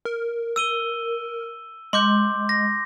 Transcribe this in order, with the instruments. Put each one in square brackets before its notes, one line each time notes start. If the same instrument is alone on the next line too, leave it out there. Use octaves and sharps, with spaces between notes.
[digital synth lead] A#4
[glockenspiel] E6 D#7 G7
[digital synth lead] G#3 [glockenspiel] C6 D6 G6
[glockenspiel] A#6